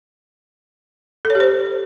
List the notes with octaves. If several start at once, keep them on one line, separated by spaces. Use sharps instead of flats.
A4
C#5
G4
C5